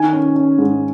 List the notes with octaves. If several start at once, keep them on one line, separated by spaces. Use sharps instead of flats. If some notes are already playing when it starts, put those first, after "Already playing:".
Already playing: D#3 G#5
C#4
C#4
G#2